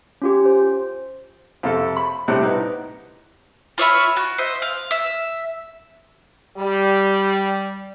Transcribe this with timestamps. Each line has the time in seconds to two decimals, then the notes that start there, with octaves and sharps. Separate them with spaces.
0.22 C#4 F4 G4
0.46 C5
1.63 F2 C3 A4
1.97 B5
2.28 A2 C3 G3 D4 F#6
2.41 B3 D#4 E4
3.78 F4 C#5 E5 B5
4.17 F#4
4.38 C5 D#5 E5
4.62 F5
4.91 E5
6.57 G3